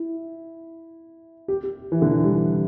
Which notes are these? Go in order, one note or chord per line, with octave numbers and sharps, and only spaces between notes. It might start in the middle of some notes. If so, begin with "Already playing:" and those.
Already playing: E4
G4
G4
E3
D3
E3
G3
E3